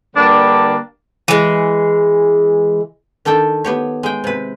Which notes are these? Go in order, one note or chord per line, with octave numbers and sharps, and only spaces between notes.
D3 G3 A#3 D4 B4
E3 G#3
D#3 D4 A4 G5 A5
B3 G4 C#5
G#3 G5
C3 B4